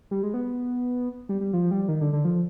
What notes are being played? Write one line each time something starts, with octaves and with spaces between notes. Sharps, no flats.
G3
G#3
B3
G3
G3
F3
G3
D#3
D3
D3
F3